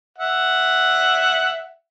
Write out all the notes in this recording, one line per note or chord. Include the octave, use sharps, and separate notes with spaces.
E5 F#5